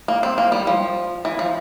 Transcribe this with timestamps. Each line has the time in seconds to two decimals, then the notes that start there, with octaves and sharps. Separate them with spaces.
0.08 A#3
0.23 C4
0.38 A#3
0.52 G3
0.67 F3
1.25 E3
1.39 F3